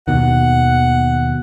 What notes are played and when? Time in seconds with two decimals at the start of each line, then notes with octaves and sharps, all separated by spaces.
0.08 D#2 B2 D#3 F#5